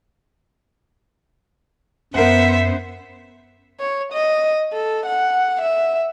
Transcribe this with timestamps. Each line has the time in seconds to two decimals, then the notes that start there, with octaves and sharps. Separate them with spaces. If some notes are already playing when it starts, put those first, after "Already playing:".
2.14 F#2 B3 A#4 C5 E5 F#5
3.80 C#5
4.13 D#5
4.73 A4
5.07 F#5
5.62 E5